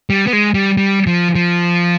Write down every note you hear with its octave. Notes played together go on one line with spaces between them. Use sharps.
G3
B3
G#3
G3
G3
F3
F3